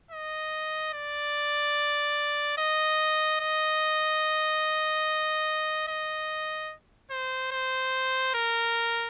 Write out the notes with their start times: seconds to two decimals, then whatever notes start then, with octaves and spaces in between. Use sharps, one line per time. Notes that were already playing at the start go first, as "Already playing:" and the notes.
0.11 D#5
0.93 D5
2.58 D#5
3.40 D#5
5.88 D#5
7.10 C5
7.51 C5
8.34 A#4